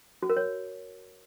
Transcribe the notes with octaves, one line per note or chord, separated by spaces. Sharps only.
F#4
A#4
C#5